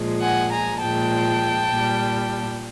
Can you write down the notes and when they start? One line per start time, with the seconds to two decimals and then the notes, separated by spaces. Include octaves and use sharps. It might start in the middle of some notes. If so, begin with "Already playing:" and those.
Already playing: A#2 F3 G#3
0.20 F#5 G#5
0.51 G#5 A#5
0.80 A#2 F3 G#3 G5 A5
1.70 A#2 G3